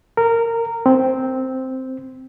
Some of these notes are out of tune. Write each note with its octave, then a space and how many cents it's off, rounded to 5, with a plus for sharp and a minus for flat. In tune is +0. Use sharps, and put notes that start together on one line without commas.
A#4 -15
C4 -5